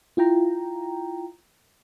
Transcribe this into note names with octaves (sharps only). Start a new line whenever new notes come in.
E4 F4 G5 A#5